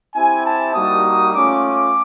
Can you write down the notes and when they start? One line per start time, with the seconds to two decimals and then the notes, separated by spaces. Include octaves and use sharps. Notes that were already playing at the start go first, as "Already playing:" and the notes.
0.15 C4 E4 G4 G#5
0.44 A5
0.74 G3 A#3 D#4 F#4 D#6
1.34 A3 C#4 F4 D6
1.64 D6